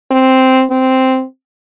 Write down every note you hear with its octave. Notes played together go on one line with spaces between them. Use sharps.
C4
C4